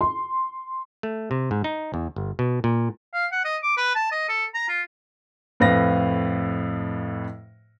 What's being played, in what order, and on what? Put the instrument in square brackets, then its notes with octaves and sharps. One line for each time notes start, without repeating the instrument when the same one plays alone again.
[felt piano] C6
[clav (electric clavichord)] A3
C3
G#2
D#4
E2
G1
B2
A#2
[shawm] F5
F#5
D#5
D6
B4
A5
D#5
A4
A#5
F4
[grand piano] F2 A2 B4 F5 A#6